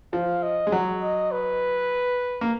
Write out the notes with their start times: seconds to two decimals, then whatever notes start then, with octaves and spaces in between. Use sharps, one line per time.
0.13 F3 F5
0.43 D#5
0.67 G#3
0.72 F#3
1.01 D#5
1.31 B4
2.41 A#3